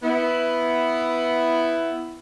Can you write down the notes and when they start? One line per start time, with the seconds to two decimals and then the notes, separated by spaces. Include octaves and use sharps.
0.03 B3 E4